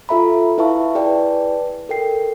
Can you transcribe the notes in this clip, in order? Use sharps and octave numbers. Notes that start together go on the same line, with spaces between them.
F4 A4 E5 A#5 B5
E4 B4 E5 F5 A5 C#6
E4 G#4 B4 D5 G5 A5
A4 A#4 G5 C7